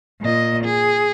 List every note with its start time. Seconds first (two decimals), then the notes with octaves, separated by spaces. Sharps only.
0.21 A#2 D#5
0.64 G#4